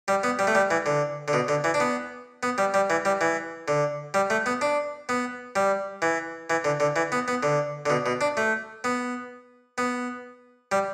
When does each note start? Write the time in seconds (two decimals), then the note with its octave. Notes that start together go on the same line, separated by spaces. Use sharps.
0.08 G3
0.23 B3
0.39 G3
0.47 A3
0.55 G3
0.71 E3
0.86 D3
1.28 D3
1.33 B2
1.48 D3
1.64 E3
1.74 D4
1.80 B3
2.43 B3
2.58 G3
2.74 G3
2.90 E3
3.05 G3
3.21 E3
3.68 D3
4.14 G3
4.30 A3
4.46 B3
4.61 D4
5.09 B3
5.56 G3
6.02 E3
6.50 E3
6.64 D3
6.80 D3
6.96 E3
7.12 B3
7.28 B3
7.43 D3
7.86 D3
7.90 B2
8.06 B2
8.21 D4
8.37 A3
8.84 B3
9.78 B3
10.72 G3